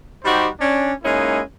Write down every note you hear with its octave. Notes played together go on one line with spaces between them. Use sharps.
G3 D#4 F#4 G4 C5
C#4 D4
G#3 A#3 C#4 D#4 E4